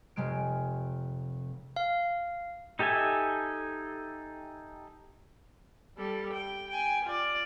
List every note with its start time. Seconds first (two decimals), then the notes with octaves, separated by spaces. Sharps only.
0.16 F1 C3 G#3 F6 D7
1.76 F5
2.79 D#4 G4 A4 E5 G#5
5.97 G3 A4
6.33 G5
6.70 G5 G#5
7.05 F4 D5